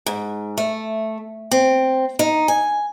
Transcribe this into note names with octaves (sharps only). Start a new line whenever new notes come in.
G#2
A3
C4
D#4
G#5